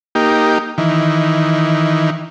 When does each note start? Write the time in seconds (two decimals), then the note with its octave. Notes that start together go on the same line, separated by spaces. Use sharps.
0.15 A#3 D#4 G4
0.78 D#3 E3